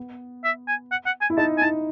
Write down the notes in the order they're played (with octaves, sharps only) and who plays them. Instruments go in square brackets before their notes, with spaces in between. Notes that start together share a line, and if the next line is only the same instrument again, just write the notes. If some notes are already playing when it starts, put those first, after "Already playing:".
Already playing: [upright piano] B3
[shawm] E5
G#5
F#5
F#5
G#5
[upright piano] E4
[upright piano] D#4 [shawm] A5
[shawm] G#5
[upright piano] E4 [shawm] A5